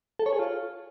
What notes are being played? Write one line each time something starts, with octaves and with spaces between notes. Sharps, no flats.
A4
C#5
G#4
F4